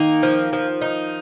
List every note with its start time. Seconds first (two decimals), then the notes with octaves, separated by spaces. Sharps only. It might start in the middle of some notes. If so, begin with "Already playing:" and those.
Already playing: D#3 A#3 D#4
0.23 F3
0.53 F3
0.81 D#4